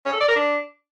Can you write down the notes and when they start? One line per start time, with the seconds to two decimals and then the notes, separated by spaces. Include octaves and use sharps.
0.06 C#4
0.13 A4
0.21 D5
0.28 A#4
0.36 D4